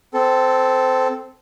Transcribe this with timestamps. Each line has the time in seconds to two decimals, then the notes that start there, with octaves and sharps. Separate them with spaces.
0.14 C4 A4